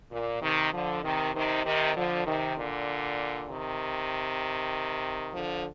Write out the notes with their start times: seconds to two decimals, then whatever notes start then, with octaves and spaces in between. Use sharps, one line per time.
0.11 A#2
0.42 C3 D#3
0.73 D3 F3
1.03 C3 D#3
1.34 C3 D#3
1.65 C3 D#3
1.95 D3 F3
2.26 C3 D#3
2.57 A#2 D3
3.49 C3 D#3
5.33 D3 F3